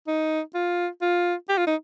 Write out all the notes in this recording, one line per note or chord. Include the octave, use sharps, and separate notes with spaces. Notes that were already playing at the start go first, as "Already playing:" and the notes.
D#4
F4
F4
G4
F4
D#4